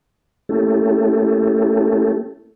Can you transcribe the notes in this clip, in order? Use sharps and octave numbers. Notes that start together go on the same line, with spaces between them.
A3 A#3 C#4 E4 G4 A4